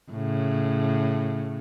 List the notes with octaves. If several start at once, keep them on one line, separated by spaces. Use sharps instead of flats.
A2 C#3